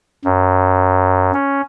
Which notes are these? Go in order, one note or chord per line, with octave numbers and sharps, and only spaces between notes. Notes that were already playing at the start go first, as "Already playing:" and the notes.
F#2
C#4